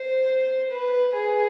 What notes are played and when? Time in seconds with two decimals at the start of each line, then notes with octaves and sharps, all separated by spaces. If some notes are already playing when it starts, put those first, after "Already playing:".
Already playing: C5
0.70 B4
1.14 G#4